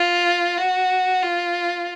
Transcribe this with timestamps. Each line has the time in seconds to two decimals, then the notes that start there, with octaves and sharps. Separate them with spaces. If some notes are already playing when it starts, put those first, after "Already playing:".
Already playing: F4
0.58 F#4
1.23 F4